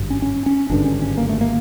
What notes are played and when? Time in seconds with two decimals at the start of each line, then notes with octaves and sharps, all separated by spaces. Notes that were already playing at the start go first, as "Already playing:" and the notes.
Already playing: G#1 G2 D3
0.10 C#4
0.22 C#4
0.46 C#4
0.70 G#1 G2 D3 D4
0.85 C#4
1.02 C#4
1.17 A#3
1.29 A3
1.41 A#3